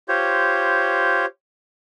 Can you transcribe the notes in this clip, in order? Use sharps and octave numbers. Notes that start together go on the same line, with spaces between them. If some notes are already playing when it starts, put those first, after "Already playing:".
F4 G4 C5 C#5